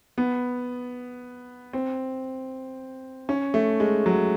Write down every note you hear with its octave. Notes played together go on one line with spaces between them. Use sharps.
B3
C4
C#4
A3
G#3
F#3